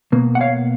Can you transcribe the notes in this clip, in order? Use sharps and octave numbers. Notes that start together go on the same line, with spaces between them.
B2 A#3
F#5
C#5 F5